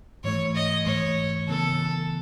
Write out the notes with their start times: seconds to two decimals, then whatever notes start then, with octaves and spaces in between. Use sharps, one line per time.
0.23 G#2 E3 A3 C#5
0.55 D#5
0.86 G#2 E3 A3 C#5
1.48 C#3 E3 B3 A4